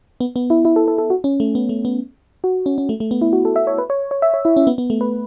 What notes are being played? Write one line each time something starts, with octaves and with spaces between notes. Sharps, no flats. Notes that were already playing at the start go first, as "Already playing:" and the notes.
B3
B3
E4
E4
A4
A4
A4
F#4
C#4
A3
B3
A3
B3
F#4
C#4
C#4
A3
A3
B3
E4
F#4
A4
E5
C#5
B4
C#5
C#5
E5
C#5
E4
C#4
B3
B3
A3
B4